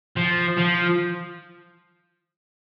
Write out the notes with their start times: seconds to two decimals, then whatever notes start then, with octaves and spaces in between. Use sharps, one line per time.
0.17 F3
0.58 F3